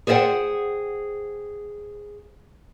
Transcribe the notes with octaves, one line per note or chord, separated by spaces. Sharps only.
G#4 C5 D5 E5 F#5 G5